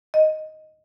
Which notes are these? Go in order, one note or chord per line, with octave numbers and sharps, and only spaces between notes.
D#5